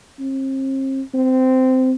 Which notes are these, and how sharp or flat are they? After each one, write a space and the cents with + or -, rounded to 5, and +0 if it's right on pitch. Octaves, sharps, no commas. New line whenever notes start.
C4 +40
C4 -15